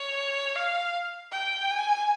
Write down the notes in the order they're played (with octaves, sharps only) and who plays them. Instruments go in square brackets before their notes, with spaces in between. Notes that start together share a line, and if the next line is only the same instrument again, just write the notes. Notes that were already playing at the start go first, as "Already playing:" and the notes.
Already playing: [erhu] C#5
F5
G5
G#5